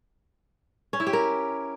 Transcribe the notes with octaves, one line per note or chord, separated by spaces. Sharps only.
C#4
E4
G4
A#4